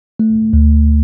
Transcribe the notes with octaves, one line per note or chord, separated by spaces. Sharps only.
A3
D2